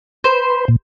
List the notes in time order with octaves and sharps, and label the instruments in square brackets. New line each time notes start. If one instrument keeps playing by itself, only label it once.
[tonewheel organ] B4 [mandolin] C5
[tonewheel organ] A#2